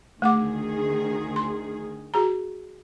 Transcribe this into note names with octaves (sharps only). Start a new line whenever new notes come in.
D2 D#3 A3 G#4 F#5 D6
C6
F#4 G#4 A#5